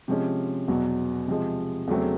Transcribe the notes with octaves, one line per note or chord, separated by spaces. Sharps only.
C3 F3 G#3 C#4
E2 B2 F#3
C3 F3 G#3
E2 C#3 F#3 A3 C4